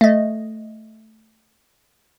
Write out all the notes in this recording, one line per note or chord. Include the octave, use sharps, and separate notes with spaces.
A3 D#5